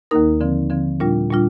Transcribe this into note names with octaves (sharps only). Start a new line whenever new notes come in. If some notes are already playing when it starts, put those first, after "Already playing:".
D#2 D#3 A#3 D#4 A#4
D3 F3 C4
D3 F3 C4
A#2 G3 D4 F4
A#2 G3 D4 F4